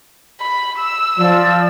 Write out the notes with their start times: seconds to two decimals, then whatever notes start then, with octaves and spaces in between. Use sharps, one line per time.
0.41 B5
0.79 E6
1.18 F3 D5